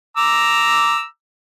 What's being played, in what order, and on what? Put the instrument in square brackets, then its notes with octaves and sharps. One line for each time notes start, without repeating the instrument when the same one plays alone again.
[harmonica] A#5 D6 E6